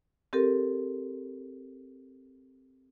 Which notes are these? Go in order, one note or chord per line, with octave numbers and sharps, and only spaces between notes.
C4 G4 A4 A#4